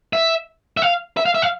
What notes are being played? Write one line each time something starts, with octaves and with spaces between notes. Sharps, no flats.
E5
E5
F5
E5
F5
E5
F5